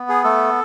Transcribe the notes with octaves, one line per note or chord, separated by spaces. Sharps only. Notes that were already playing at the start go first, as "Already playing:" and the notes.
Already playing: B3
G#4
A3 A4